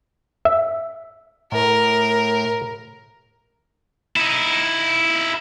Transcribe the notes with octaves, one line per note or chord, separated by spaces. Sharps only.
E5
A2 A#4
D#4 E4